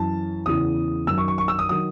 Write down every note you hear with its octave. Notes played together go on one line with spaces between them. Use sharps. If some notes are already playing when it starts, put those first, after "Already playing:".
Already playing: F#2 E3 A5
E2 C#3 E3 D#6
F#2 D#3 F#3 E6
C#6
C#6
C#6
E6
D#6
D#3 F#3 D#6